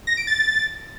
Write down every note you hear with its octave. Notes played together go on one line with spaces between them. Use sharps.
A#6
D7
A6